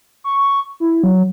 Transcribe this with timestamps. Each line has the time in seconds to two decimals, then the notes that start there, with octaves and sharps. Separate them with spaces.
0.24 C#6
0.80 E4
1.03 F#3